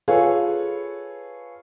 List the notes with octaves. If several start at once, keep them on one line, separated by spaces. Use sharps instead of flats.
F4 G#4 A4 B4 C#5